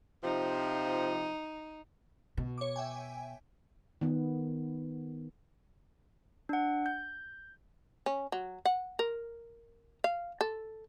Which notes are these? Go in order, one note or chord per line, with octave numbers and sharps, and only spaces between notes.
C3 F3 D#4
B2
C#5 D6
E5 G5 G#5
D#3 B3
D4 F#5
G6
C#4
F#3
F#5
A#4
F5
A4